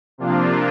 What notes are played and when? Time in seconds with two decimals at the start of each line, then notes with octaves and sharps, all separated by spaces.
0.18 C3 F3 A#3 D4 F4